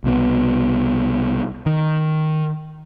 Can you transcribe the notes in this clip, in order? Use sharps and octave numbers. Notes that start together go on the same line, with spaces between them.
C2 B2 D#3 B3
D#3